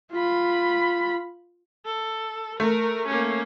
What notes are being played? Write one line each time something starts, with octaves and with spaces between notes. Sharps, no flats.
F4 B5
A4
A3 A#4
A#3 C#4